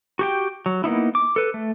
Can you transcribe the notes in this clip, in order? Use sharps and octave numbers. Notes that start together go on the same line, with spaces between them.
F#4 G4 G5
F#3
A#3 B3 D#4 E4
D6
A4 B4
A3